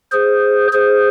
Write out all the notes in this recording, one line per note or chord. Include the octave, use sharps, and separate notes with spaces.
G#4 C5
G#4 C5